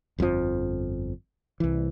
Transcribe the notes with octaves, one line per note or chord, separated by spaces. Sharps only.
G1 F2 A#2 F3
C2 E3